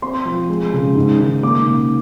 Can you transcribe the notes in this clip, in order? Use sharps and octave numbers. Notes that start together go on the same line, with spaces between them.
C4 C6
F3
G#3
C#3
G#2
D#3
A#3 D6
C#3